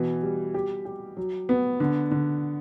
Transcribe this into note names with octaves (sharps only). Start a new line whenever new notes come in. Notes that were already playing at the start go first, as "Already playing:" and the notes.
Already playing: B2 E3
G3
G4
G4
F#3
B3
D3
D3